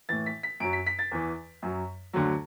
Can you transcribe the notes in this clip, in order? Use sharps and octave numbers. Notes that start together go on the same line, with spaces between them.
A2 E3 A6
B6
B6
F#2 F#3 D7
B6
B6
A6
E2 E3
F#2 F#3
D2 D3 F#3